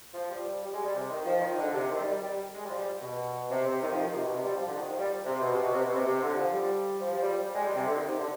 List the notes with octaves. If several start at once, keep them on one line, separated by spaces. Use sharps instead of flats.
F3
G3
G3
G#3
G3
C3
D#3
F3
D#3
D3
C3
D#3
G3
G3
G3
G#3
G3
F3
G3
B2
C3
C3
D#3
F3
D#3
C3
B2
C3
G3
F3
D3
D#3
F3
G3
C3
B2
C3
B2
C3
B2
C3
C3
D3
F3
G3
F3
F3
G3
G3
G#3
G3
C3
D3
D#3
C3
D3